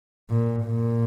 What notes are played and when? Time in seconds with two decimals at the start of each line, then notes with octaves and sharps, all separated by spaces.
0.30 A#2
0.66 A#2